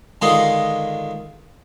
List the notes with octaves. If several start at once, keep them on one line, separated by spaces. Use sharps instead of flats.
D3 D#3 G#3 F4 D#5